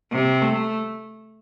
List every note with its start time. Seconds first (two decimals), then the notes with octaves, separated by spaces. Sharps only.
0.12 C3
0.42 A3